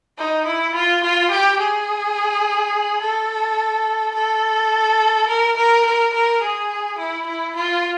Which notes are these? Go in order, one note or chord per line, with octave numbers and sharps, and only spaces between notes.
D#4
E4
F4
F4
G4
G#4
A4
A4
A#4
A#4
A#4
A#4
G#4
E4
E4
F4